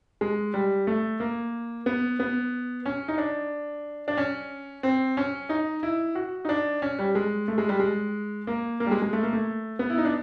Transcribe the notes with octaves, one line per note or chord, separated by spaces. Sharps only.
G#3
G3
A3
A#3
B3
B3
C#4
D#4
D4
D4
C#4
C4
C#4
D#4
E4
F#4
D#4
D4
C#4
G3
G#3
A3
G#3
G3
G#3
A#3
A#3
G3
G#3
G#3
A3
A#3
A3
B3
E4
D#4
D4